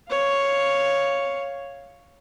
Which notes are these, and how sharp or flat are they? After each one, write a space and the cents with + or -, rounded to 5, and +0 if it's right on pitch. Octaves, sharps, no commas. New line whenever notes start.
C#5 +0 F5 +0